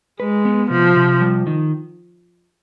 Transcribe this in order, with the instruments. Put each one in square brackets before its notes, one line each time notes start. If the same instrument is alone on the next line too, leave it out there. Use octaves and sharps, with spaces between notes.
[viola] G#3 [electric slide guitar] B4
[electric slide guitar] B3
[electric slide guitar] C3 [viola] F3
[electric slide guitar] C3
G3
D#3